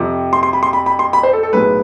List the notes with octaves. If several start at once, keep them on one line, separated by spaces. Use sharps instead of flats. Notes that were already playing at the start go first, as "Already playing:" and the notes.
Already playing: F2 C3 F3
C6
C6
B5
C6
B5
B5
C6
B5
C5
A4
A4
B1 A2 G#3 B4